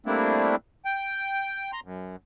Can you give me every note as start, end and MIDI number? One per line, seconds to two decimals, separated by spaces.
0.06 0.56 55
0.06 0.56 57
0.06 0.56 58
0.06 0.56 60
0.06 0.56 62
0.06 0.56 64
0.85 1.71 79
1.72 1.80 82
1.72 1.80 84
1.84 2.16 42